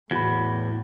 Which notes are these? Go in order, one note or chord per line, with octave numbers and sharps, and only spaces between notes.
E2 A2 F#4 B5